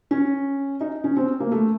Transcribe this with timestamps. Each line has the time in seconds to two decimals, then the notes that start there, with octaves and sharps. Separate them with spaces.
0.11 C#4
0.81 D#4
1.04 C#4
1.17 C4
1.40 A#3
1.52 A3